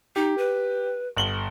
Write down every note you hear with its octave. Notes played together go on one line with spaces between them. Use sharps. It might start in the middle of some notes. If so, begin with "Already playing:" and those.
D#4 G4
B4
G1 F#7 G7